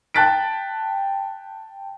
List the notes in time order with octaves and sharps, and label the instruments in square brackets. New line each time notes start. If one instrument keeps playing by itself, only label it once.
[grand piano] G5 A5 F#6 A6 B6 D7